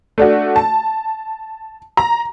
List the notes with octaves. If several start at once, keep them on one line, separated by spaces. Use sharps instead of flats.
A3 D4 F#4
A5
A#5